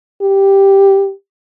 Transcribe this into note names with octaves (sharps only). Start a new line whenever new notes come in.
G4